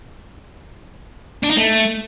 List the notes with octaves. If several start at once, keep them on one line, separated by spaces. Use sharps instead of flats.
D4
D#4
A3